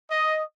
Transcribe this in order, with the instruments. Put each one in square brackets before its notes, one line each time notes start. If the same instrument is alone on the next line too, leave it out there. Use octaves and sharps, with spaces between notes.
[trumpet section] D#5